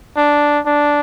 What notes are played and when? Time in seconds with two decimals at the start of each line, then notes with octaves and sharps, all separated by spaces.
0.17 D4
0.66 D4